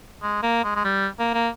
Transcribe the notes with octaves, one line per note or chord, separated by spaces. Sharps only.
G#3
A#3
G#3
G#3
G3
A#3
A#3